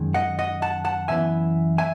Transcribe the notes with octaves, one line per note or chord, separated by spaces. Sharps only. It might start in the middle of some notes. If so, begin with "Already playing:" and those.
Already playing: F#2 D#3 G#3
D#5 F#5
D#5 F#5
F#5 A5
F#5 A5
F#2 E3 B3 E4 E5 G#5
E5 G#5